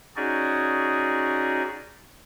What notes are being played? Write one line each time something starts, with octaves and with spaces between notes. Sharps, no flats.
C#4 D#4 F#4 G#4 D5